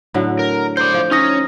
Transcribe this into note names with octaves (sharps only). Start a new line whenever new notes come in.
A2 D3 F#3
A#4
C5 D5 G6
F3
C#4 D#4 D#6 A#6